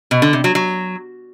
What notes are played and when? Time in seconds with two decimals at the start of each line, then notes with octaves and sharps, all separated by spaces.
0.11 B2
0.22 D3
0.33 C3
0.44 F#3
0.55 F#3